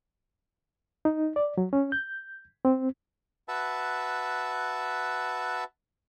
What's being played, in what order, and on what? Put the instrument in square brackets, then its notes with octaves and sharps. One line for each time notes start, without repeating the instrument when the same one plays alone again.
[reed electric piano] D#4
D5
F#3
C#4
G6
C4
[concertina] F#4 B4 E5 A5